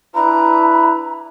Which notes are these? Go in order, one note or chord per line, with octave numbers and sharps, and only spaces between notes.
D4 E4 B4 A#5